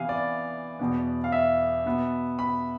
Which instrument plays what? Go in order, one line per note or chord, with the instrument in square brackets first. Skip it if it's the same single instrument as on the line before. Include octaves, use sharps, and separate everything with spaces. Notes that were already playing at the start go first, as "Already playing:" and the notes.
Already playing: [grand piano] C3 E3 B3 F5 G#5
D5
E2 B2 B3
F5
E5
B2 B3
B5